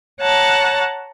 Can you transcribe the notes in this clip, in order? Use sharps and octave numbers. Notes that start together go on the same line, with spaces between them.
C#5 F#5 A5 A#5